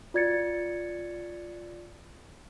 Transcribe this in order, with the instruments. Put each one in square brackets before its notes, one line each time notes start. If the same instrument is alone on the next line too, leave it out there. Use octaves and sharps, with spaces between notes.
[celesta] F4 D5 G#6 A6 C#7